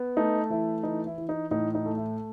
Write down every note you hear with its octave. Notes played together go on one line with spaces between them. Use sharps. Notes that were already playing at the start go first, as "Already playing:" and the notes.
Already playing: B3
A3 D#4
E3 E4
E3 D#4
E4
E3
D#4
A2 D#4
D#4
A3
E4